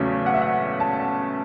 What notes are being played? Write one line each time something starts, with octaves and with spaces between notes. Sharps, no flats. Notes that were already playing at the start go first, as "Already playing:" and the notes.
Already playing: E2 C#3 F#3 A3 C#4
F#5
E5
F#5
A5